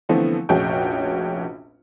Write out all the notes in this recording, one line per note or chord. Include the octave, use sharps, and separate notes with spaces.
D3 E3 F3 A3 B3 C4
F1 A#1 C#4 F#4 G#4 G5